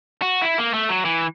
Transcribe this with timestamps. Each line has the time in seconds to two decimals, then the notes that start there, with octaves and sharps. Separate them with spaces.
0.22 F#4
0.42 E4
0.58 A#3
0.74 A3
0.89 F#3
1.05 E3